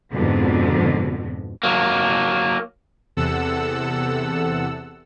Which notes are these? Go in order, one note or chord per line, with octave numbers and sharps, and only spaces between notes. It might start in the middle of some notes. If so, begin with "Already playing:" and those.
F2 G#2 B2 D3
F#3 A#3
E2 C3 A4 F#5 E6